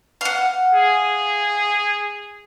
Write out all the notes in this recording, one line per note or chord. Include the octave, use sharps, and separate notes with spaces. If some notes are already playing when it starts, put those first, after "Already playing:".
F5 F#5
G#4